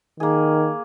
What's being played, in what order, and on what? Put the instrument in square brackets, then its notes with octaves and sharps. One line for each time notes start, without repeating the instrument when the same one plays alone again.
[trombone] D#3 [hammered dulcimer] A#3 G#4